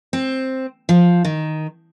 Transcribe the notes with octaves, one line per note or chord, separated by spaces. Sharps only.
C4
F3
D#3